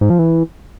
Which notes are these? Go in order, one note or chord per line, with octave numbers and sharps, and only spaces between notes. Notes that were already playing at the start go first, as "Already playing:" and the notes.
G#2
F3
E3